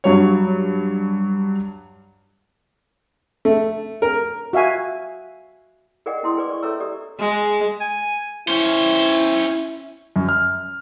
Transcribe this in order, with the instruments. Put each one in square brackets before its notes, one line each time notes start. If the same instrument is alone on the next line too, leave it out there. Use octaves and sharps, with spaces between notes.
[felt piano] G2 F#3 C#5
[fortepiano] A3
A#4
[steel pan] F#4 E5 F5 G#5
[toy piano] G#4 A#4 D5 D#5 F#5 G5
C#4 E4 C6 D#6
D4 G#4 B4 D5 D6
D5 C#6
C#4 A4 C#5 E5 A#5 E6
G4 D5 D#6
[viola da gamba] G#3
[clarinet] G#5
[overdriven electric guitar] C#4 C5 [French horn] E4
[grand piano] F#2
F6